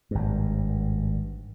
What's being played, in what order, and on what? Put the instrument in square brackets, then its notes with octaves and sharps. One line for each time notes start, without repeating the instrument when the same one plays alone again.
[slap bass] G#1 G2